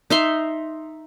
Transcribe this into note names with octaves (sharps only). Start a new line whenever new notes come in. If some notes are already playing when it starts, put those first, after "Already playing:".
D#4 E5 C6